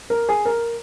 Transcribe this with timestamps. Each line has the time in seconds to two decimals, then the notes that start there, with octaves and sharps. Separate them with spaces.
0.10 A#4
0.29 G#4
0.45 A#4